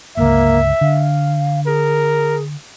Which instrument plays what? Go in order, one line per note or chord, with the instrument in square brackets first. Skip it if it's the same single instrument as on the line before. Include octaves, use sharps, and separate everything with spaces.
[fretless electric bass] G1 C#2 [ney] A#3 [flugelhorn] E5
[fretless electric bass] D3 [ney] F5
[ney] G#4 [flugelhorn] A#4